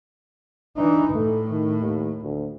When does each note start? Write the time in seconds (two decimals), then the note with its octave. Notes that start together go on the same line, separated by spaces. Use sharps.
0.77 E3 D4 D#4
1.14 A2 A3
1.50 D#3
1.81 D#2
2.23 D2